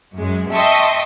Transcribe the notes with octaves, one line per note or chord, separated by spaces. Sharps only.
F#2 G#3
D#5 E5 G5 A5 C6 C#6